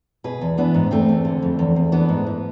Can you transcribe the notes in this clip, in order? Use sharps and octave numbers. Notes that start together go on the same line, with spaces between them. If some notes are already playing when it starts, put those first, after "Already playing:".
B2 G#4 B4
E2
E3 B3 D4
G#2
E2 A3 C4
E2
D3
F2
E2
E2
E3 B3 D4
G#2
G#2